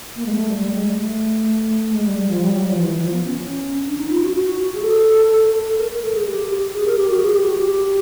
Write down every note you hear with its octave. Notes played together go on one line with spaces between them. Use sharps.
A#3
G#3
A3
G3
G#3
G3
G#3
A3
A3
G#3
G3
G3
F3
G3
F#3
F3
E3
E3
F3
B3
C#4
C#4
D4
D#4
F4
F#4
F#4
G#4
A4
A4
A#4
A#4
A4
G#4
G4
G4
G#4
A#4
G4
F#4
G#4
G4
F#4
G4